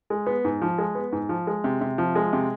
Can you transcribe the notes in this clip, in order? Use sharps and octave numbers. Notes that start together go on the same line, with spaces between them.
G#3
B3
G#2
F3
G#3
B3
G#2
F3
G#3
C3
C3
F3
G#3
C3